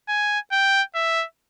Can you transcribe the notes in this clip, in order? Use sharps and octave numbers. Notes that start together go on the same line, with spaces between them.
G#5
G5
E5